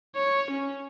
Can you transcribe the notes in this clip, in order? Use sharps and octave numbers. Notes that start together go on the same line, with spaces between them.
C#5
C#4